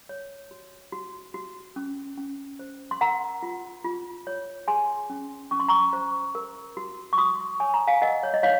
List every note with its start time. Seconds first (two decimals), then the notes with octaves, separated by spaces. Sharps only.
0.09 C#5
0.51 F#4
0.92 F#4
1.34 F#4
1.76 C#4
2.18 C#4
2.59 C5
2.91 C6
3.01 A#4 F#5 A#5
3.43 F4
3.85 F4
4.27 C#5
4.67 G#4 G#5 C6
5.10 C#4
5.51 C#4 C#6
5.60 C6
5.69 A#5 C#6
5.93 C5
6.35 A#4
6.77 F#4
7.13 C#6
7.18 F#4 C6 D#6
7.60 C#5 G#5
7.74 A#5
7.87 F5 G#5
8.01 A#4 D#5 F#5
8.23 C#5
8.34 D#5
8.43 D#4 C#5 F5